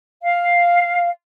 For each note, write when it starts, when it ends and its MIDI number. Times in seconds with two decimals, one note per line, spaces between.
0.24 1.08 77